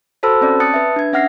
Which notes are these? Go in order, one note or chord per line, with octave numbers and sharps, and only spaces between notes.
F#4 A4 C5 A5 B5 E6
C4 C#4 D5
A5 D#6 F#6 A6 C#7
B4 E5
D4 G#6
C#4 E5 F#5 F6 A#6 C7